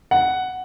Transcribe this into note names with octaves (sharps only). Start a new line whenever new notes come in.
F#5